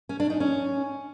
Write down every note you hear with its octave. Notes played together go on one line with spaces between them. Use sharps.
C#4
D4
D#4
C#4